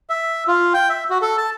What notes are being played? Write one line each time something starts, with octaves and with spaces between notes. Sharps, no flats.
E5
F4
G5
E5
F#4
A4
A5